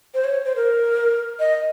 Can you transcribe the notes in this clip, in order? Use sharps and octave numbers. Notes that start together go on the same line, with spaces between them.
C5
C#5
C5
A#4
D#5